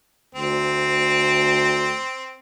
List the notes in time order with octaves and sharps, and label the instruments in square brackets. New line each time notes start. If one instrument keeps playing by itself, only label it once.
[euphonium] D2 [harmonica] C4